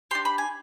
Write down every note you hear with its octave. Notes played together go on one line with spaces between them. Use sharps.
D4 G4 C6
B5
G#5